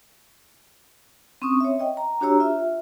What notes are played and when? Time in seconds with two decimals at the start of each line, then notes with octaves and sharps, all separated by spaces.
1.42 C4 C#4 C#6 D#6
1.60 C#5 E5
1.80 D#5 G5
1.97 A#5
2.21 D4 F#4 G4 C#5 A#5 E6
2.40 F4 E5